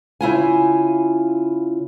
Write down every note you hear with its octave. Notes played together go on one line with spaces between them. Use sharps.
C#3 E4 F4 G#5